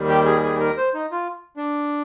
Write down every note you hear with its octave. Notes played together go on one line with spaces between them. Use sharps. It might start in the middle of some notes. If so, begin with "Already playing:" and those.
Already playing: D#2 D#3 G3
G4
G#4
G#4
A#4
C5
D#4
F4
D4